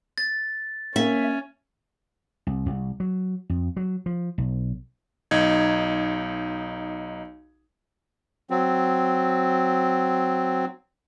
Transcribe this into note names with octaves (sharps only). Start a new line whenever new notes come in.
A6
A#3 C#4 E5
C2
C2
F#3
F2
F#3
F3
B1
B1 D#4 G#6
F#3 C4